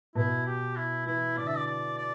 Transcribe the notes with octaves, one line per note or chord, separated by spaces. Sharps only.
B2 E4
G4
E4
E3 E4
D3 D5
E5
D5
D5
D5